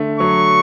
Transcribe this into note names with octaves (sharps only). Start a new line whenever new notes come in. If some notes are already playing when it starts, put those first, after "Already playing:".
Already playing: D3 A3
F#3 C#6